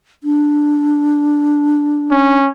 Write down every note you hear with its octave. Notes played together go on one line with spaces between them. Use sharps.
D4
C#4